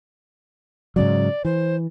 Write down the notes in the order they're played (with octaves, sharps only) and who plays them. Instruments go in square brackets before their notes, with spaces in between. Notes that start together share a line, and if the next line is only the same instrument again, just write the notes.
[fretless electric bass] G#2 C#3 F#3 [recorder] D5
[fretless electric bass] E3 [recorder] C5